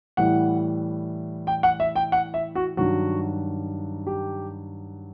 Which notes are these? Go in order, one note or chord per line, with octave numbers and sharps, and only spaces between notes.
A2 E3 G3 F#5
G5
F#5
E5
G5
F#5
E5
F#4
G2 D#3 F#3 F#4
G4